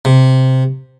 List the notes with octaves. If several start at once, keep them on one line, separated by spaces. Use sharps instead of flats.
C3